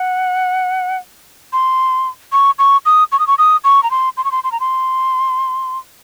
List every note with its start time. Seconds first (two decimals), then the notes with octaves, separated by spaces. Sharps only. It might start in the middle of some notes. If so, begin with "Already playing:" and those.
Already playing: F#5
1.53 C6
2.32 C#6
2.59 C#6
2.86 D#6
3.12 C#6
3.19 D#6
3.27 C#6
3.38 D#6
3.64 C#6
3.83 A#5
3.91 C6
4.17 C6
4.25 C#6
4.32 C6
4.44 C6
4.52 A#5
4.60 C6